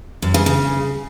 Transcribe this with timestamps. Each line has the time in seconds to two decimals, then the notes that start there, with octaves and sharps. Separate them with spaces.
0.22 F#2
0.34 C#3
0.46 C#3